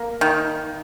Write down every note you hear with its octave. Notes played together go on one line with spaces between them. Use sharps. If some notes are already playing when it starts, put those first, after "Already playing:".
Already playing: A#3
D#3